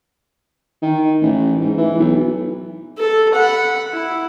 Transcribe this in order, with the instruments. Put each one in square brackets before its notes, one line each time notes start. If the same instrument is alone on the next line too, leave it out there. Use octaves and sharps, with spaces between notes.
[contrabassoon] D#3
A1
G#2
E3
B1
[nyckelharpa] A4
F#5 B5
E4